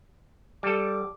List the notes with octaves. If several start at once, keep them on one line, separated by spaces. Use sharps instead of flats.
G3 A4 D6